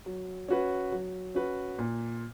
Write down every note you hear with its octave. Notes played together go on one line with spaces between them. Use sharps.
F#3
C#4 F#4 B4
F#3
C#4 F#4 B4
A#2